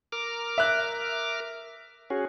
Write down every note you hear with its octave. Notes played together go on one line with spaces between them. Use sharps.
A#4 D6 F6
E5 F#6
C#4 F#4 G#4